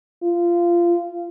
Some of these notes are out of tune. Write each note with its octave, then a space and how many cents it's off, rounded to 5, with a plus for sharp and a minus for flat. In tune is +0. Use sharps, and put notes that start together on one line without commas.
F4 -20